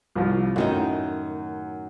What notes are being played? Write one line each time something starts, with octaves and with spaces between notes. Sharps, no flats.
C2 F3
F#2 A2 D#3 D#4